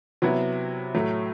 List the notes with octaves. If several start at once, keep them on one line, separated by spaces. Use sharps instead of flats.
C3 F#3 B3 E4
A2 F#3 A3